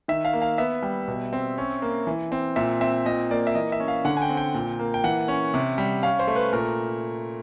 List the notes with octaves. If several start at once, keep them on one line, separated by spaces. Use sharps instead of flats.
D#3 E5
F5
A#3
F5
B3 E5
G3
B2
C4
C#4
A#3
E3
C4
A#2 E5
C4 E5
A#2 D#5
A#3 D5
E5
E3 D#5
E5
C#4
F5
D3 F#5
G#5
G5
C4
G5
A#2
A#3
G5
E3 F#5
C#4
C3
G3
C#4 F5
C5
A3
B4
A#2 A#4